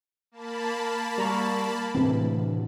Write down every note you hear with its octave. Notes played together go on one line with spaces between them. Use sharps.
A#3 A5 B5
G3 A#5 C#6
D2 A2 C3 E3 C4